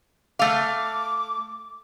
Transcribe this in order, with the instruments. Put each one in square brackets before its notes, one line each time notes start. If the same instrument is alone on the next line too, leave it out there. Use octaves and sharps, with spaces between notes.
[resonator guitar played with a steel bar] A3 F5 [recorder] D6